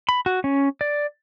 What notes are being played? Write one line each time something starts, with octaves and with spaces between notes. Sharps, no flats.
B5
F#4
C#4
D5